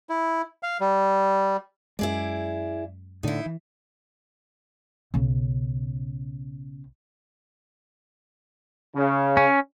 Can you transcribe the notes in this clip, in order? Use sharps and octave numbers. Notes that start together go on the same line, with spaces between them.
E4
F5
G3
F#2 G#3 E4 G#4 D5
A2 D3 D#4 E4
E3
B1 C#3
C#3
C#4